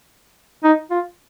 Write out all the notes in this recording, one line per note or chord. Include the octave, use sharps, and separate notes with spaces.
D#4
F4